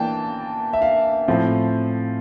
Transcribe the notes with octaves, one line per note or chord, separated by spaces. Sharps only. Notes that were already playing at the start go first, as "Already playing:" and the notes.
Already playing: E3 A#3 D4 G5 A5
E5
F5
A2 F3 C4